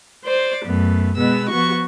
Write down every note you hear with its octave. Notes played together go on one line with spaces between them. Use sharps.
C5 D5
F#2 A3 B3
B2 G#3 B3 E6
F3 B3 F#4 C#6